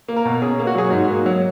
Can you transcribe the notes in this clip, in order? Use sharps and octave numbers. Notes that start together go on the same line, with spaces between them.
A#3
A#4
B2
C#4 G#4
A#3
F#4
F#3 G#4
G#2 F#4
A#3
F#3